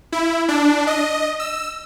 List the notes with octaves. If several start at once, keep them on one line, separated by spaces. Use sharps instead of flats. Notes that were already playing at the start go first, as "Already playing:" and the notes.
E4
D4
D#5
E6